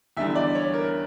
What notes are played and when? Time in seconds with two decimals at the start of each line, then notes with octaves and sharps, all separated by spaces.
0.17 E2 D3 G3 E5
0.35 D5
0.55 C#5
0.74 A#4